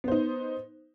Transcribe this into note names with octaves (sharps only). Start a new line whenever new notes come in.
B3 D#4 C5